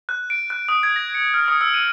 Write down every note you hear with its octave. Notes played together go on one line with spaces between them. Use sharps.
F#6
D7
F#6
D#6
G#6
A#6
C#7
F6
D#6
E6
D#7